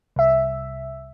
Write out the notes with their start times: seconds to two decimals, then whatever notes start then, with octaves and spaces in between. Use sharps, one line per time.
0.16 C2 E5